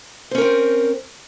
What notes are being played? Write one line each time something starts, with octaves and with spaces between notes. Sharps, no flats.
C4 C#4 A#4 C5